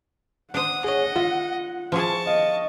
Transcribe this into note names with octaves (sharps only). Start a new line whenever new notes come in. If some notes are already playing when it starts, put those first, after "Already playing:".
D4 C5 F#5 D#6
G#4 C#5 D#5
F4 E5
F3 E4 G#4 A5 C#6
D#5 F5